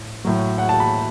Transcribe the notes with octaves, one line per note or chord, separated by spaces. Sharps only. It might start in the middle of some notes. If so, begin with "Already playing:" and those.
Already playing: A2
A2 F#3
F#5
A5
B5